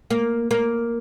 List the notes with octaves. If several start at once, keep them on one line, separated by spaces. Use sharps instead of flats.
A#3
A#3